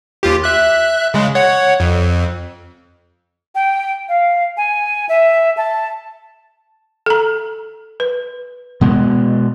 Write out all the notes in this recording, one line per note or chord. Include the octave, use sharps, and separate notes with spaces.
D#2 F4 G4
E5 F#6
C#3 G#3
C#5 F#5
F2
G5
F5
G#5
E5
A5
A4 A#5
B4
B2 G#3 B3